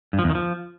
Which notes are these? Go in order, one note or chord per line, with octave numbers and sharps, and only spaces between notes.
G2
F3
E2
D#3
F3